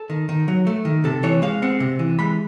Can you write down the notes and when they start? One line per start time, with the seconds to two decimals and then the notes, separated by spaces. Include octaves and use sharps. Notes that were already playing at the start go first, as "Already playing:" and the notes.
Already playing: A4
0.10 D#3
0.29 D#3
0.48 F#3
0.67 A3
0.85 D#3
1.04 C3 A4
1.23 E3 C#5
1.42 G#3 F5
1.62 C4 F#5
1.80 C3
1.99 E3
2.19 G#3 B5